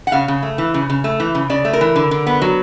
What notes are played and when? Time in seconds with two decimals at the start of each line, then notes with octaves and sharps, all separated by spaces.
0.07 F#5
0.12 C#3 F5
0.28 C#3
0.43 A3
0.58 E3
0.74 C#3
0.90 C#3
1.04 A3
1.20 E3
1.35 C#3
1.50 C#3 D5
1.65 A3
1.73 A#4
1.81 E3
1.96 D3
2.11 D3
2.27 B3
2.42 F#3